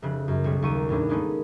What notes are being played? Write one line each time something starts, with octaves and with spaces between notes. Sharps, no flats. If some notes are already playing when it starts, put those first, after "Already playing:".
F1 C#3 F#6
F#2
B1 G3 C#5
D#2 C#6 D#7
E2 A2 C#4 D4
G#3 A#3 B3 C#4 D#4 A4